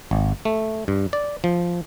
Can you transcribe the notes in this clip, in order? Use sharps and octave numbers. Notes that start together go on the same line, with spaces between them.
G#1
A3
G2
D5
F3